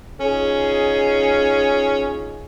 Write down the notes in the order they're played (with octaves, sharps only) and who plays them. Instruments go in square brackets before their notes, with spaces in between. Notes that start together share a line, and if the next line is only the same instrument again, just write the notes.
[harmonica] C#4 [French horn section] D#4 F4 G#4